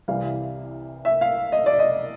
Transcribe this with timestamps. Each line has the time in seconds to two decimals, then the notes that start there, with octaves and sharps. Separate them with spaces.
0.08 C2 C3 E3 G3 F5
1.05 E5
1.21 F5
1.52 D#5
1.66 D5
1.79 D#5